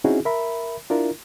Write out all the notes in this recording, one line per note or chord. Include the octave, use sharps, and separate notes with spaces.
C4 C#4 D#4 E4 F#4 G#4
A#4 E5 B5
D4 E4 F4 A#4